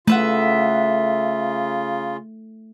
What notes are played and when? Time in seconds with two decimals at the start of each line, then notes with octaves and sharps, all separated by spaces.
0.08 C#3 A3 F4 B4 E5 F#5